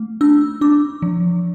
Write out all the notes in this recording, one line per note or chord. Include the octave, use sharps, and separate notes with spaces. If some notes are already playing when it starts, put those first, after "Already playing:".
Already playing: A3
D4 E6
D4 D6
F3